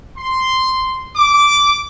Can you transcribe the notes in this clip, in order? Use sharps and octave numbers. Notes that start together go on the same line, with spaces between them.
C6
D6